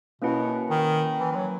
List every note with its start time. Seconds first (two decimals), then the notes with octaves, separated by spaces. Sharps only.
0.22 B2 A#3 C#4 E4 B4 F#5
0.70 D#3
1.20 E3
1.31 E3
1.35 F#3